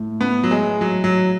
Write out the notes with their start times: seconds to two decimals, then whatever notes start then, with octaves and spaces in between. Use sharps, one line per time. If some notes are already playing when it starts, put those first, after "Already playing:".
Already playing: A2
0.21 B3
0.44 F#3
0.51 G#3
0.81 F#3
1.04 F#3